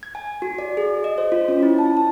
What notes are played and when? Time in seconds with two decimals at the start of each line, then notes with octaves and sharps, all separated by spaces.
0.03 G#6
0.15 G#5
0.42 F#4
0.59 D5
0.77 G#4
1.04 D#5
1.18 C5
1.32 F4
1.48 C#4
1.63 E4
1.78 A5
1.97 A5